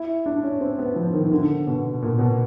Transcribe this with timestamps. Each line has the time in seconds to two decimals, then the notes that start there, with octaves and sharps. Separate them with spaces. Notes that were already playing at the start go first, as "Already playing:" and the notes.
Already playing: E4
0.26 D4
0.43 C#4
0.60 C4
0.79 B3
0.96 F3
1.13 D#3
1.28 D#3
1.32 D3
1.67 B2
2.02 A#2
2.19 B2